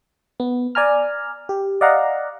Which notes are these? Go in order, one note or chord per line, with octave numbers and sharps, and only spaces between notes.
B3
D5 G#5 A#5 F6
G4
D5 D#5 F5 F#5 A#5